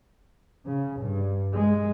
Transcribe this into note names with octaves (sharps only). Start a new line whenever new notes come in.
C#3
G2
G#3